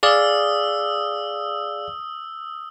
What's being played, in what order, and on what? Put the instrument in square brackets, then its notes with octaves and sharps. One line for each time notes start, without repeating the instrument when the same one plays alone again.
[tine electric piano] G#4 D5 F5 [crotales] D#6 E6